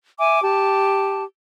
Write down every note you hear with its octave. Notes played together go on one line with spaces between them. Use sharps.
E5 G#5 D6
G4 A5